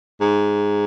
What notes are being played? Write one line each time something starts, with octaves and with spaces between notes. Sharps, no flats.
G#2